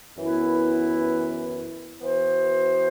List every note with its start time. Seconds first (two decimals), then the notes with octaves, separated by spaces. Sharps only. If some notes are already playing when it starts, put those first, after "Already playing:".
0.16 F#2 E3 B3 E4 B4
2.00 E3 B3 F#4 C5